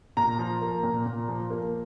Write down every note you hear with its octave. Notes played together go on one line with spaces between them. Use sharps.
A#2 A#5
F3
A#3
A#2
A#2
F3
A#3